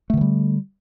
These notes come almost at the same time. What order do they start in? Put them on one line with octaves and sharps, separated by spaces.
A3 D3 E3 G3